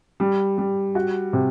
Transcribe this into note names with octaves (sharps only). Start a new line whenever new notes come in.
G3
G3
F#4
C3